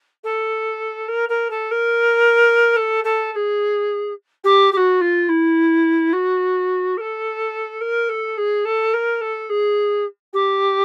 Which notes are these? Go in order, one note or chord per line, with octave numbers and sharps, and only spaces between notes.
A4
A#4
A#4
A4
A#4
A4
A4
A4
G#4
G4
G4
F#4
F4
E4
F#4
A#4
A4
A#4
A4
G#4
A4
A#4
A4
G#4
G4